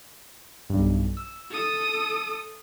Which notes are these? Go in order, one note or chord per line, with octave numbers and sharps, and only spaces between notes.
B1 G2
E6
A4 D#6